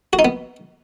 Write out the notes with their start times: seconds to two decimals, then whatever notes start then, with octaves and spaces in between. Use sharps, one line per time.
0.13 F#4
0.19 D#4
0.25 B3